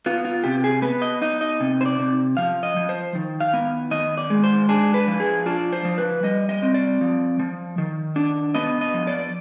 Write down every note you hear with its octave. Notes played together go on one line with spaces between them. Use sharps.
B3 F4
F4
C3 G4
G#4
B3 B4
D#5
D#4 D#5
D#5
C3
C5
D5
C3
F3 F5
D#5
F3
C5
D#3
F5
B3
D#3 D#5
D5
G#3
C5
D4 G#4
B4
F3
G#4
D4 F4
C5
F3
B4
G3 D#5
D#5
C4
D5
F3
F3
D#3
D4
B3 D#5
D#5
F3
D5